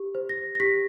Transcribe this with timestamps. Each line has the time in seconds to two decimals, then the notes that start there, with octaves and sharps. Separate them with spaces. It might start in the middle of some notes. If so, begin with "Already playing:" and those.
Already playing: G4
0.15 C5
0.29 A#6
0.55 A#6
0.60 G4 B6